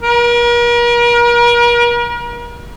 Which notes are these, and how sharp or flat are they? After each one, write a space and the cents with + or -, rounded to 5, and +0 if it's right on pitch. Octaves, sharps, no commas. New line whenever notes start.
A#4 +40